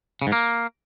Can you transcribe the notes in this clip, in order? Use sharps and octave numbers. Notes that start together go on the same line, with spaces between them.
C#3
G#2
A#3